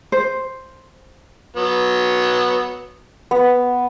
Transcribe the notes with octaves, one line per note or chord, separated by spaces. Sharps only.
C5
F#3 B3
B3